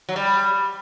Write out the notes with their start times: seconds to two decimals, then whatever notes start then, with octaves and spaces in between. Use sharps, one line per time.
0.09 F#3
0.16 G3